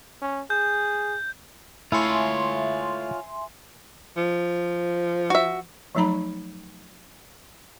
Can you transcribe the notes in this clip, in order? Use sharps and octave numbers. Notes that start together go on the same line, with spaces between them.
C#4
G#4 G6
A3 E4 F4 A4 C#5 E5 G#5 C6
F3
F#4 E5
F3 F#3 A3 D#4 A#5 B5